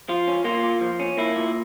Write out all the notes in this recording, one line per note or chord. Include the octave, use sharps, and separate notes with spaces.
F3 F4
C#4
A#3 F4
A#2
F3
C#4
A#3 E4
A#2